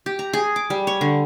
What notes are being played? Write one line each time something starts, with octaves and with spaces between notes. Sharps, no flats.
G4
A#5
G#4
D6
G3
C#5
D3